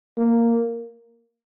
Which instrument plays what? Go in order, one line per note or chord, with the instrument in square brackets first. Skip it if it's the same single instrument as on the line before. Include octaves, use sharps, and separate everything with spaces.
[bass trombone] A#3